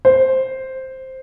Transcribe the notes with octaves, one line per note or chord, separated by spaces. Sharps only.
C5